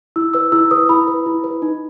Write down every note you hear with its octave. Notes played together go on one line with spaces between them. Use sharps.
E4 E6
B4 E6
E4 E6
B4 D#6
E4 B5
B4
E4
B4
D#4